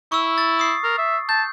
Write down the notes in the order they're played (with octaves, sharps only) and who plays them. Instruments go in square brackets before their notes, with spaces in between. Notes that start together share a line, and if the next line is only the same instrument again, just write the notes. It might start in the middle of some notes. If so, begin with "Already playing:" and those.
[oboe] E4 [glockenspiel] C#6 E6
[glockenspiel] A6
D#6 C7
[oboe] A#4
E5
[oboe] A5 [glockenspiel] G6